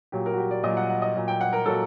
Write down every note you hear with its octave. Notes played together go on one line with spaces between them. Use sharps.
A#2 F#3 G4
A#4
F#4
G4
D5
A#2 F#3 D#5
F#5
F#5
D#5
A#2 F#3
G5
F#5
A#4
A#2 F#3 A4